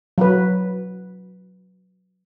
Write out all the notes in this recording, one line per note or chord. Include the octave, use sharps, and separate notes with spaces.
F#3 B4